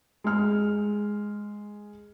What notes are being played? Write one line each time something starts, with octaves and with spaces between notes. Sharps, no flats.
G#3 F6